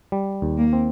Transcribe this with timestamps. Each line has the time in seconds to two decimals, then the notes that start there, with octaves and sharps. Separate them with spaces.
0.12 G3
0.42 D#2
0.58 A#3
0.73 C4